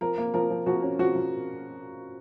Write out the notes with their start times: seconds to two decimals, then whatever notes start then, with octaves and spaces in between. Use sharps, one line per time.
0.01 F3 A#4
0.18 A#3
0.34 F3 A#4
0.50 F3
0.66 F3 F#4
0.83 C#4
0.99 F3 F#4
1.15 F3